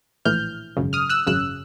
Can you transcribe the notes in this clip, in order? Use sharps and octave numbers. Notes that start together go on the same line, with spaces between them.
A#1 A2 E3 F6 G6
G#1 F#2 C#3
D#6 F6
E6 F#6
G#1 F#2 C#3 E6 F#6